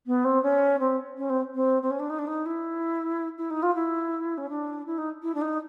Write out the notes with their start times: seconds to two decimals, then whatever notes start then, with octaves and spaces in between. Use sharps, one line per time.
0.06 B3
0.24 C4
0.43 C#4
0.79 C4
1.17 C#4
1.29 C4
1.54 C4
1.82 C4
1.90 C#4
1.99 D4
2.09 D#4
2.18 D4
2.27 D#4
2.45 E4
3.37 E4
3.50 D#4
3.62 F4
3.74 E4
4.37 C#4
4.49 D4
4.86 E4
4.98 D#4
5.22 E4
5.34 D4
5.41 D#4